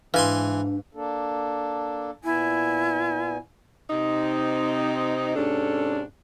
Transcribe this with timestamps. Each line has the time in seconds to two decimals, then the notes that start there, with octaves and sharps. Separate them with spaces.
0.14 G#2 E3 D4 B4 F5 G#5 C6
0.95 A#3 D4 A4
2.24 A#2 B3 E4 G#5
3.90 C3 C4 D#4
5.35 G#2 C3 C#4 D4 A4